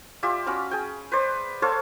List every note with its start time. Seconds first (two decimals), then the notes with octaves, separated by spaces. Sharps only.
0.23 F4 G4 D5 E5
0.46 C#4 F#4 F5 B5
0.71 G#4 G5
1.12 B4 C5 D5
1.62 A4 C5 C#5 F5